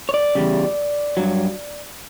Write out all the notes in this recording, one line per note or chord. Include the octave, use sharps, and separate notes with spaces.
C#5
D5
E2 C#3 G3
G2 F#3